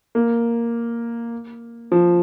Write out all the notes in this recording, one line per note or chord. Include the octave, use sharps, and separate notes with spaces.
A#3
F3